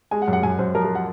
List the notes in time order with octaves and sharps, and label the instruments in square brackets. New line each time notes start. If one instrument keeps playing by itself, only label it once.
[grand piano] G#3 [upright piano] G#5
[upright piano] F#5
[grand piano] F#2
[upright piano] F#5
[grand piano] F#2 [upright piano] G#5
[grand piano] F#2 [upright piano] C5
[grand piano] F3 [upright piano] A#4
[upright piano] A#4
F#5